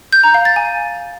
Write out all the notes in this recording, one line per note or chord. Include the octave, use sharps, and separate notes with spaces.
G6
A#5
F5
A6
G#5